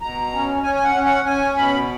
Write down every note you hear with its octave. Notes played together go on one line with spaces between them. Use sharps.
B2 A#5
C#4
C#4 G#5
G#5
F#5
C#4
F#5
C#4 G#5
B2 B5